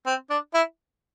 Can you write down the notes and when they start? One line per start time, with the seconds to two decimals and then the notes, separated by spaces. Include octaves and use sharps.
0.07 C4
0.30 D4
0.54 E4